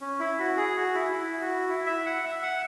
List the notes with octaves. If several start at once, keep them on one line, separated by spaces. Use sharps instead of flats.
C#4
E4
F#4
G#4
F#4
E4
E4
F#4
E4
E5
F#5
E5
F#5